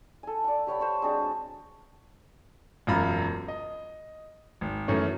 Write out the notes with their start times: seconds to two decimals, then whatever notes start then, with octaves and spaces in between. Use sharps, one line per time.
0.23 A4 G#5
0.44 D5 F#5
0.67 G4 C#5 F#5 B5
0.80 C5 C#5 B5
1.02 G#3 C4 D4 F#4
2.87 E1 F#2 F4 A#5 B5
3.48 D#5
4.61 G#1
4.88 F#2 E3 A3 C#4